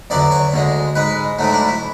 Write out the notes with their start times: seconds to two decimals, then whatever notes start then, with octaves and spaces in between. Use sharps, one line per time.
0.10 E2 D3 F#3 D5
0.31 C#5
0.53 D2 D3 G#3
0.95 G#2 G#3 B4
1.39 G#2 F#3 A3 E4
1.53 D4
1.67 E4